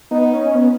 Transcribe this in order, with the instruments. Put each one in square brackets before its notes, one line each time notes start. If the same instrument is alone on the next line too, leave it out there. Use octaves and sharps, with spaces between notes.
[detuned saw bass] B3 [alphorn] D#4
[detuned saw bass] C#4
B3